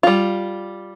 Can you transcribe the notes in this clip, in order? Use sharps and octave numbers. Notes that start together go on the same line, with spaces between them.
G3 F4